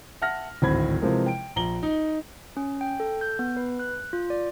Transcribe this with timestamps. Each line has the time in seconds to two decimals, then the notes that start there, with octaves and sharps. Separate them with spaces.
0.22 E5 F#5 A5 F6 A#6
0.62 D1 G#1 C4 B5 G#6
1.02 C3 E3 F3 G#3 A#4
1.26 G5 D7
1.56 A#1 A#5 F#7 G7
1.83 D#4
2.57 C#4
2.81 G5
3.00 A4
3.21 G6
3.39 B3
3.57 B4
3.79 F#6
4.13 F4
4.30 D5